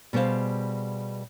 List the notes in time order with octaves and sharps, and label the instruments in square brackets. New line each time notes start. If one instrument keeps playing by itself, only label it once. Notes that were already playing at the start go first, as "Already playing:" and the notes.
[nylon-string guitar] B2 G3 G#4 C5 F5